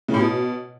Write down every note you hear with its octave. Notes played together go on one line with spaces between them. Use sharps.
C#3
A2
B2